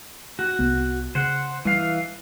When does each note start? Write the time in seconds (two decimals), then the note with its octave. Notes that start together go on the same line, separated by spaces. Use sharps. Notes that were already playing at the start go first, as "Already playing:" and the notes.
0.39 F#4
0.59 C2 B3
1.15 C#3 C5 F#5
1.65 E3 G3 F5